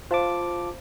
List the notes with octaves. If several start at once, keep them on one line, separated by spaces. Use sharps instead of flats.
F4 C5 F5 A5 D6